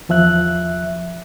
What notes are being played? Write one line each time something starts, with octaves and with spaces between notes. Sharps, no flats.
E2 F3 E5 F#6